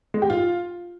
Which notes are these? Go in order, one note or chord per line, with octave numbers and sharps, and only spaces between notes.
G#3
G4
F4